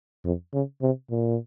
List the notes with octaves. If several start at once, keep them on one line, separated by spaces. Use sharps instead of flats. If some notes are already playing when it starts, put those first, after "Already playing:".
F2
C#3
C3
A#2